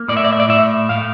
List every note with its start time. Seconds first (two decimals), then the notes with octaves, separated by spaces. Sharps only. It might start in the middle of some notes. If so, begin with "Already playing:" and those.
Already playing: A#3
0.08 A2 D5
0.17 E5
0.25 D5
0.33 E5
0.40 D5
0.49 A2 E5
0.89 A2 F5